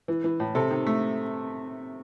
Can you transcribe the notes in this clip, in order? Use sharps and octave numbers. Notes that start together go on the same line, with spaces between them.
E3
E3
A2
C3 A4
D#3
A3